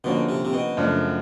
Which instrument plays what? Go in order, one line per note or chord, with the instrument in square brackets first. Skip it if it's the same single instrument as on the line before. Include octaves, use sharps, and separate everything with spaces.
[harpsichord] B2 [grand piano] D3 F3 A#3 C#4
[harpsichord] C3
C3
B2
[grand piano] F#2 C#3 F3 A3 D4